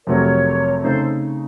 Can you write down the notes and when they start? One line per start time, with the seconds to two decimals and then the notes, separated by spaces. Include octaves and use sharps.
0.07 F2 C3 F#3 A3 C4 A#4 C#5
0.84 C#3 A3 C4 D#4 A4 C5